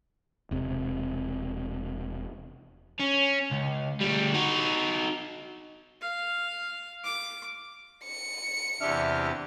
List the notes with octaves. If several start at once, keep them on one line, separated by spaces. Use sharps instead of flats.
E1 C3
C#4
C#2
D2 G3
D#4 F#4
F5
D6
C#7
E2 C3 D4 G4 E5 F6